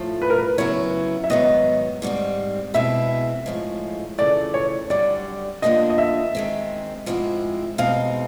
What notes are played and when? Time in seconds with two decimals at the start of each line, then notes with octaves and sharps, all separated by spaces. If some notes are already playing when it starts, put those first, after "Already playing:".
Already playing: A2 F3 A3
0.22 B4
0.30 A#4
0.38 B4
0.58 C#3 F#3 B3 E4 C#5
1.24 E5
1.30 G#2 D#3 F#3 B3 D#5
2.02 G#2 D#3 G3 C4
2.74 B2 G#3 C4 E4 E5
3.46 A2 F3 G#3
4.18 F2 C#3 E3 A3 D5
4.54 C#5
4.90 F#2 D3 G3 D5
5.62 D3 F3 A#3 D4 D#5
5.90 D#5
5.98 E5
6.35 D#3 G#3 C4
7.06 G#2 F3 G#3 C4 E4
7.78 B2 G#3 C4 D#4 F5